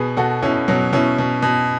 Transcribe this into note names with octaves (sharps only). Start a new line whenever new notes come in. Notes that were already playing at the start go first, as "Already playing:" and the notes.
Already playing: B2 G#4 B4
B2 F#4 A4
B2 C#4 E4
B2 F#3
B2 C#4 E4
B2
B2